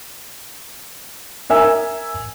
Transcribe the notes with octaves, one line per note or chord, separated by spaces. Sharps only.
A#4 E5 G#5 E6